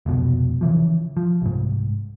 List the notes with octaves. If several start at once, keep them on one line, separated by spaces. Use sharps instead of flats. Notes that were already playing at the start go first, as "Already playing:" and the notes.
F1 C#2 B2
C#3 E3 F3
F3
C2 G#2